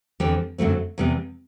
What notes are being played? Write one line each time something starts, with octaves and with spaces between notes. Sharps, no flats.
E2 D3 G3 C4 G4
F#2 D3 F#3 A3 C4
E2 C3 G3 B3